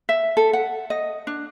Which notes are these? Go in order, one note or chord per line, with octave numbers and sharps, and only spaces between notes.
E5
A4
F#5
D#5
D4